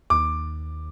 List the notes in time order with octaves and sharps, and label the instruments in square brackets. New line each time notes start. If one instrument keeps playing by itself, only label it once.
[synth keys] D#2 [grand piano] D6